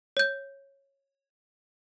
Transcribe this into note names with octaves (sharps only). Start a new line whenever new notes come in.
C#5 G6